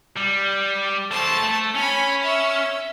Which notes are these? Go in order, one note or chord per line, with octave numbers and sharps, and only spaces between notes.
G3
A3 C5 A5
A3
C#4 G#5 B5
E5